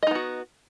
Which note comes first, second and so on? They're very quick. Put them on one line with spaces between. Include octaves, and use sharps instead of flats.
D#5 D#4 B3 F#4